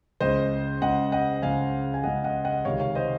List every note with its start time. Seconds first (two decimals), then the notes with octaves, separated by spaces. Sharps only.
0.20 C#2 C#3 C5 D#5
0.82 C#2 C#3 D#5 F#5
1.12 D#5 F#5
1.42 C#2 C#3 F5 G#5
1.94 G#5
2.03 C#2 C#3 D#5 F#5
2.24 D#5 F#5
2.45 D#5 F#5
2.65 C#2 C3 D#3 C#5 F5
2.80 C#5 F5
2.95 C5 D#5